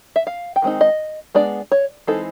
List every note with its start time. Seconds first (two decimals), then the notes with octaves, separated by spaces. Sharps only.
0.16 E5
0.27 F5
0.56 G5
0.62 D#3 G#3 C4 D#4
0.81 D#5
1.35 G#3 B3 D4 D5
1.72 C#5
2.07 E3 G#3 C4 D#4 A4